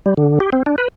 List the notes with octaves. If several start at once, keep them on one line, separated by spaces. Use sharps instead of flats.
G3
D3
G4
C4
D4
B4